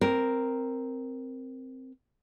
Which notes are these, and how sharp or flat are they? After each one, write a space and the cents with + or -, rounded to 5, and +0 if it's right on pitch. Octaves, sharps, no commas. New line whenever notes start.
C4 +0 A#4 +0